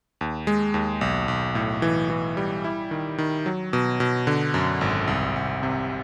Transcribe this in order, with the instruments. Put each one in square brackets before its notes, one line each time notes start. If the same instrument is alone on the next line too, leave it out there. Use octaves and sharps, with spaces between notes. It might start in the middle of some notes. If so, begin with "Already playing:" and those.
[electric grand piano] D#2
G#3
D#2
B1
B1
A2
E3
E3
G3
E4
D#3
D#3
F#3
B2
B2
D3
F#2
G#1
C2
C2
C3